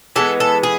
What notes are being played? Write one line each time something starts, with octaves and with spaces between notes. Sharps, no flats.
E3 G#3 B3 A4
A4
G#4